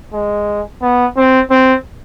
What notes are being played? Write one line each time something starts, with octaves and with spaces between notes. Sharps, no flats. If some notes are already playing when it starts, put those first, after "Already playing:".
G#3
B3
C4
C4